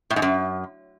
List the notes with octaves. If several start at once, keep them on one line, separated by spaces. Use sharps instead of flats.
A2
G#2
F#2